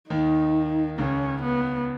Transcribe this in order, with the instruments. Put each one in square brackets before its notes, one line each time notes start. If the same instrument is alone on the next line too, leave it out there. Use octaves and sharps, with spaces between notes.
[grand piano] D#2 D#3 [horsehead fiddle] D#4
[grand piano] C#2 C#3 [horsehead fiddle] C#4
[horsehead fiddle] B3